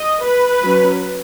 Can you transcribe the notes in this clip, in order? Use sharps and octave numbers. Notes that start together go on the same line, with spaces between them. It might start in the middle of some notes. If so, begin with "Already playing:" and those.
Already playing: D#5
B4
F#3 C#4